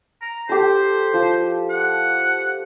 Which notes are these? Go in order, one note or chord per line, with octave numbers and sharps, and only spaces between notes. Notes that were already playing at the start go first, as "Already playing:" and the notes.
A#5
G4 A4 C5
F3
F#5